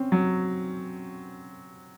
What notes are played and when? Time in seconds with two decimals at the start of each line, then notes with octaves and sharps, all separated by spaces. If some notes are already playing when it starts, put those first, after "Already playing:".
Already playing: C4 C#4
0.12 F#3